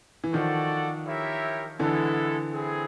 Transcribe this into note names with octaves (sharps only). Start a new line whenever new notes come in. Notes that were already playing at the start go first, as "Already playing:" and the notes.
E3
D#3 F3 F#4 A4 D5 F#5
E4 G4 A#4 C#5 E5
D3 E3 G#3 B3 E4 A4
C4 E4 G#4